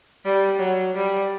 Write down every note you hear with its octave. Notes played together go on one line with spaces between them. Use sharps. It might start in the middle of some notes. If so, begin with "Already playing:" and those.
G3
F#3
G3